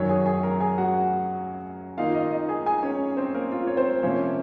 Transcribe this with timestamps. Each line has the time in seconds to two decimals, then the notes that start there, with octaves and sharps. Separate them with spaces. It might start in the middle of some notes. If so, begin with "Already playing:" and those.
Already playing: F#2 D#3 F#3 C#4 C#5
0.09 G#4 G#5
0.26 G#4 G#5
0.43 A#4 A#5
0.60 G#4 G#5
0.78 F#4 F#5
1.97 D#3 A#3 D#4 F4 F5
2.15 D#4 D#5
2.32 D#4 D#5
2.49 G#4 G#5
2.66 G#4 G#5
2.83 C#4 C#5
3.17 C4 C5
3.34 A#3 A#4
3.52 F4
3.67 C#5
3.77 C4 C5
4.03 C3 F3 A#3 C#4 C#5